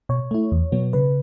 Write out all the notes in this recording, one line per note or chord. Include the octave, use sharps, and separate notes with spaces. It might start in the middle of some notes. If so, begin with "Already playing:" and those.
B2 C#5
A3 E4
E2
B2 F#3 B3
C#3 B4